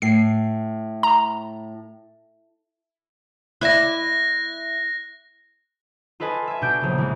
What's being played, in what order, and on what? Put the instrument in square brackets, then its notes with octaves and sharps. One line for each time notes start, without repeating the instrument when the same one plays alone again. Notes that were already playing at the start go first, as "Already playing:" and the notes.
[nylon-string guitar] A2 [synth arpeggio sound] C7
[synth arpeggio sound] A#5
[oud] E4 D5 E5 [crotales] F#6 A#6
[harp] F4 A4 B4 D#5 G#5 A5
E5 G#5
B2 D4 G6 D7
A#1 C#3
E3 G#3